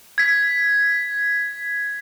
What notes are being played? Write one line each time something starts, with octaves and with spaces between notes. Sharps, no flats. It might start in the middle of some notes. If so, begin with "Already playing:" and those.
G#6 B6